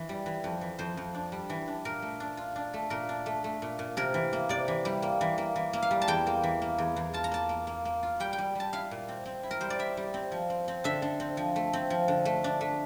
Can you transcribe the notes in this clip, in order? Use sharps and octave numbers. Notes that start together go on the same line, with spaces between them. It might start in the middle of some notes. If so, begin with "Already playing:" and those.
Already playing: E3
G3
E3
F2
E3
F2 C5
F2
D4
G3
E3
D4
A#2 A#4
A3
D4
F4
D4
A3
A#2 A#4
D4
A3
A3
A#2
A#2
C3 A#4
E3
A#3
C3 D5
E3
G3
A#3
E3
A#3
E3
A#3
F5
G3
A5
E2 G5
A#3
E3
A#3
E2
E2
F4 A5
A#5
A#3 A5
A#3
A#3
A#3
F4
G3 G5
G5
G3
G3 A5
E4 F5
A#2
C4
C4
E4
A#4
G3 C5
D5
E4 E5
G3
C4
F3
C4
C4
D3 E5
D3
C4
F3
A3
C4
F3
D3
A3
D4
A3